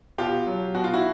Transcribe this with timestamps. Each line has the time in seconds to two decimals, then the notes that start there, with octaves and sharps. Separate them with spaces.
0.18 B2 F4 G4
0.47 F#3
0.74 B2 F#4
0.84 F4
0.93 E4 F#4